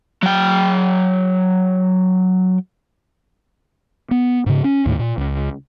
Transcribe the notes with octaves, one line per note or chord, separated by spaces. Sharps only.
F#3 G5
B3
G#2 C#3
C#4
D#2 A2
A#2
C#2